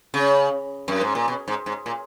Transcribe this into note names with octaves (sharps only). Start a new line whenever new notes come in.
C#3
F#2
G#2
A#2
B2
G#2
G#2
A#2